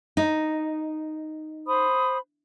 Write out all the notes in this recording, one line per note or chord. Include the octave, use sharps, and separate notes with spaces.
D#4
C5 B5 D#6